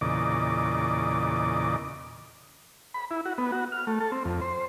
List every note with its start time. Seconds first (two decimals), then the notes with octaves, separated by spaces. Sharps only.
0.01 E2 A#2 C#3 D5 D#5 D6
2.94 B5
3.11 E4
3.25 F#4
3.38 B3
3.52 F#4
3.72 F6
3.87 A3
4.00 A4
4.12 C4
4.25 F2
4.41 C5